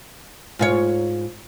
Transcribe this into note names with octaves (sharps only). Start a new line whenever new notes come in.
G#2 F4 C#5